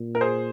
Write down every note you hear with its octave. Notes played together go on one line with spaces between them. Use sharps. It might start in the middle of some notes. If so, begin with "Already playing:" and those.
Already playing: A#2
A#4
G#4 C5